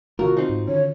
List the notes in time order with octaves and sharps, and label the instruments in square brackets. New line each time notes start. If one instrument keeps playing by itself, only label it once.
[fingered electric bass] C3 D#3 A3 [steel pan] F4 F#4 [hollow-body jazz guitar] A#4
[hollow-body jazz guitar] C4 D#4
[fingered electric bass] G#2
[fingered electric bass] D3 D#3 C#4 [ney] C#5